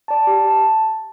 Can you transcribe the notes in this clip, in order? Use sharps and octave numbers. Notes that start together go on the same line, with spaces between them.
D5 A5
G4
A5